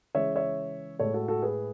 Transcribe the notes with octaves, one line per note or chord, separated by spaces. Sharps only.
C#3 E3 G#3 C#5 E5
C#5 E5
A2 G#3 A4 C#5
F#4 A4
F#4 A4
G#4 B4